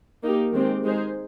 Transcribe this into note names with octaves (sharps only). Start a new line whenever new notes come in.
A#3 D#4 G4
D#3 G#3 C4 G4
G#3 D#4 G#4 C5